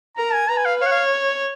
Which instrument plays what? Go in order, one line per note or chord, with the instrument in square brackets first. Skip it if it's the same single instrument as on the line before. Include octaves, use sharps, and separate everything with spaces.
[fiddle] A#4 [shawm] A#5
[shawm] G#5
[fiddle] B4 [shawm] A#5
[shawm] G#5
F5
[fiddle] C#5 [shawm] F5
[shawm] F#5
F5